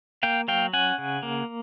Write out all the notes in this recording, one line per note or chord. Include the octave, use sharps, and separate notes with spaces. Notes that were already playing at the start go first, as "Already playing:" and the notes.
A#3 F5 G5
F#3 F5 G5
C#4 F#5 G#5
C#3
A#3